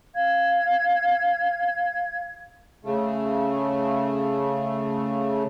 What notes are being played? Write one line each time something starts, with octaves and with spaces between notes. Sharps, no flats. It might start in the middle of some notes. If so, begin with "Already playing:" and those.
F5 G#6
C#3 A3